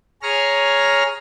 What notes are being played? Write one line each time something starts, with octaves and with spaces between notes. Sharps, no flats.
G#4 C#5 A#5 F6